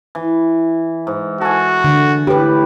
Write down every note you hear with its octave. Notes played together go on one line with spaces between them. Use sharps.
E3
G#2
F#4 A4 G#5
D3
A2 G4 B4 B5 D6